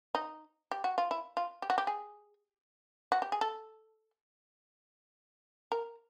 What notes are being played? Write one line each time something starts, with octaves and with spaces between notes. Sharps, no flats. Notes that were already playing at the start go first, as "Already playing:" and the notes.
D#4
G4
F#4
F4
E4
F4
G4
F#4
G4
G#4
F#4
G4
G#4
A4
A#4